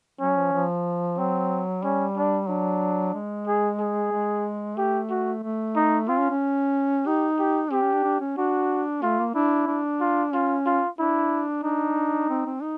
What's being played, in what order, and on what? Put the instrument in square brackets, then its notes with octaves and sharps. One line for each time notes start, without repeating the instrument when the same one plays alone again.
[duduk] F#3 [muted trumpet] C#4
[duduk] F3
F3
[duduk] F#3 [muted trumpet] C4
[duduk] G3 [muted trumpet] C#4
[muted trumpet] D4
[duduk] F#3 [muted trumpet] D4
[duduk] G#3
[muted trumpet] G#4
G#4
[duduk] G#3
[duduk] A3 [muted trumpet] G4
[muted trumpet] F#4
[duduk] A3
[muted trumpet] D#4
[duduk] C4 [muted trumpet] F4
[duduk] C#4
C#4
[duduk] D#4 [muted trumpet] G4
[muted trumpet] G4
[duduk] C4 [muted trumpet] G4
[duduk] C#4
D4
D4
C#4
[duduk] D4 [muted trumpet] F#4
[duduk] A3 [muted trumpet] F4
[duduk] A#3
[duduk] D4 [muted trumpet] E4
[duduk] D4
[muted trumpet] F4
[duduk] C#4 [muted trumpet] F4
[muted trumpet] F4
[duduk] D4 [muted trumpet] E4
[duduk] D4 [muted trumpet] D#4
[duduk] C4
C4
D#4